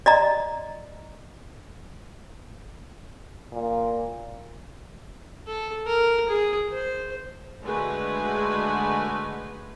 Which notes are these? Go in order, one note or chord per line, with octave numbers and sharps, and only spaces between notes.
D5 D#5 A#5
A#2
A4
A#4
G#4
C5
D3 G#3 A3 F#4 B4 G#5